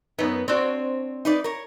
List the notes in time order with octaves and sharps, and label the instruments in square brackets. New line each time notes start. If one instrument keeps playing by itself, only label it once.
[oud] F#2 B3 [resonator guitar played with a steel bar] D#4
[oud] C4 D4 F#4 [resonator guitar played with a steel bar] C#5
[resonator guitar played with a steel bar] D#4 B4 D5
A#4 C#5